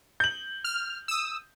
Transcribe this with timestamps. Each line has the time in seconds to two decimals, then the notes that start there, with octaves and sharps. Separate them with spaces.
0.20 G6 F#7
0.64 F6
1.08 D#6 E6